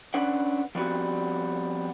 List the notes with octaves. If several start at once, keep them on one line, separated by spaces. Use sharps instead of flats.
C#4 D4 B4 F#5
F3 G3 B3 C4 F#4